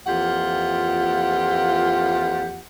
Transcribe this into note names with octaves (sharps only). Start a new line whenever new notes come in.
F2 E3 A#3 F4 G4 F#5